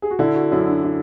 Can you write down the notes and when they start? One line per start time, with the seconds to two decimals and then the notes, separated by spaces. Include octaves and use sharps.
0.02 G#4
0.10 F#4
0.19 D3 E4
0.35 F#4
0.52 F#2 E4
0.67 D4
0.84 E4